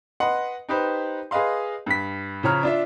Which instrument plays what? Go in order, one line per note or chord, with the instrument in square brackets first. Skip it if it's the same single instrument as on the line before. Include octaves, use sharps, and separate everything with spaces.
[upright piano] B4 D#5 F#5 C6
D#4 G4 B4 C5
G#4 B4 D#5 F5 C6
G2 B6
C#3 F3 C#5 A#5 F6
D4 F4 E5